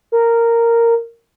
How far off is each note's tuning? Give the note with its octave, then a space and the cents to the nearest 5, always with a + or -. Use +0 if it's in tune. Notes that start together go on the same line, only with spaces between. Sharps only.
A#4 -10